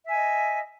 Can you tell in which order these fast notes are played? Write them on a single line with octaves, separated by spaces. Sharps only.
E5 G#5 D#5